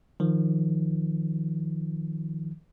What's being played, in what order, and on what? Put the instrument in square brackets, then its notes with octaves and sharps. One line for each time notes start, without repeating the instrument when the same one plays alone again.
[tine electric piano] D#3 F3